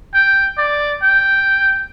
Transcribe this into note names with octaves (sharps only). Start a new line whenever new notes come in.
G5
D5
G5